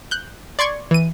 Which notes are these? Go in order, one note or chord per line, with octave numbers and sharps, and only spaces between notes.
F#6 G6
D5 C6 C#6 G#6
E3 D#7